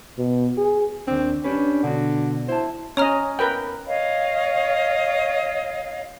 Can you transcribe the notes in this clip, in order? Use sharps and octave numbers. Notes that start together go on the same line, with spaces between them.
B2
G#4
D#2 G#2 C4 D4
C#4 D4 G4 B4
B2 D3 F#4
E4 C5 A5
C#4 C#5 D#5 A#5 F6
A#4 B4 G5
C#5 D#5 F5